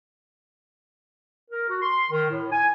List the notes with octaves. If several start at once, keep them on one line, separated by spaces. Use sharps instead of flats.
A#4
F#4
C6
D#3
A2
G#5